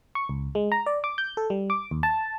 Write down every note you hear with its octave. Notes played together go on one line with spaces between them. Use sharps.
C#6
C#2
G#3
A#5
D5
D6
G6
A4
G3
D6
D#2
A5